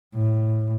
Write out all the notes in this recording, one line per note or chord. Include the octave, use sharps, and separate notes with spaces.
A2